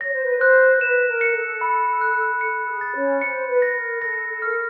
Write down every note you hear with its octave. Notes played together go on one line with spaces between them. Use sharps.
C#5 A#6
C5
B4
C5 F#6
B4 E7
A#4
C#7
A4
B5
F#6
A4 C#7
G#4
A6
C#4 C#5
C5 C#7
B4
A#6
A#4
A4 A#6
A4
A#4 F6